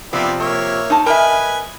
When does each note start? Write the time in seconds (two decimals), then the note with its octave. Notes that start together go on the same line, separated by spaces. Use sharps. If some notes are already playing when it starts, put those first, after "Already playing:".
0.13 C3 F3 B3 C4 D5
0.39 A#3 C#5 E5
0.90 D#4 A5
1.06 A#4 B4 D#5 E5 G#5